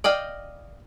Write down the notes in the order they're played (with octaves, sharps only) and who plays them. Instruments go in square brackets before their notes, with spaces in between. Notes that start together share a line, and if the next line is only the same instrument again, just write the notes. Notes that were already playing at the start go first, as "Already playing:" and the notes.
[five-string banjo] D5 D#5 F5 G5